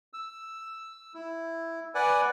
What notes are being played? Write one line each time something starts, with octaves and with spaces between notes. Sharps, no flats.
E6
E4
B4 D5 F#5 G#5